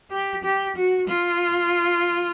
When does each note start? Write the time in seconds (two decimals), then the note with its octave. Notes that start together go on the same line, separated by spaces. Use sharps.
0.11 G4
0.44 G4
0.76 F#4
1.08 F4